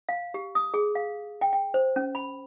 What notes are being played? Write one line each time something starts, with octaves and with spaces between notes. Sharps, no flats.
F5
G4
D#6
G#4
F5
G5
G5
C5
C#4
B5